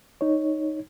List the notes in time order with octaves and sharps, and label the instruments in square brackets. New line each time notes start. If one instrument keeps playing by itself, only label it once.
[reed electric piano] D#4 C#5